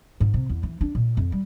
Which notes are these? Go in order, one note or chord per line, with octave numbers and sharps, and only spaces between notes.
G#2
C3
E2
E3
D4
A#2
F2
G3